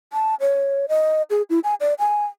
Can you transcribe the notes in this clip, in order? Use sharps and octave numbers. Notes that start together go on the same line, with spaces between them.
A5
C#5
D#5
G#4
E4
G#5
D5
G#5